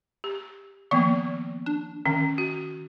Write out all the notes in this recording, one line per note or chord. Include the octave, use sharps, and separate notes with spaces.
G4
D#3 F3 A#3 B3
D4
D#3 C#4
F#4